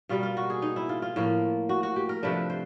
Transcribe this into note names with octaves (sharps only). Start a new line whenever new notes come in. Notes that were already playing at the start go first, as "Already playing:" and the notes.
B2 G3 A#3 F4
F4
F#4
G#4
D#4
E4
F4
F4
A2 F3 A#3
F#4
F#4
G4
A#4
C3 F3 A3 D4 B4
C5